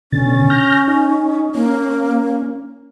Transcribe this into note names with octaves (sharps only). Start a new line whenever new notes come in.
B2 D3 C#4 A6
F6 G6 A#6
D#4
A#3 C#4